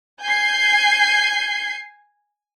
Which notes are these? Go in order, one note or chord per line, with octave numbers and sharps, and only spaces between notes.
G#5 G6 G#6 C7